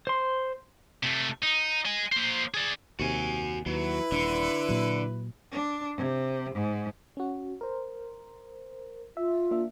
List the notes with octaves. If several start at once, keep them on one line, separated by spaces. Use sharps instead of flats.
C5 C6
C3 A3
D#4
D#5 G#5
A#3 C5
G#4 D5
D#2 C3 F#4 G#5
D#2 F#3 E4 B4
D#1 D3 D4
A#2 F#3
D4
C3
G#2
C#4 F#4
A#4 C5
F4 E5
A#3 D4 E5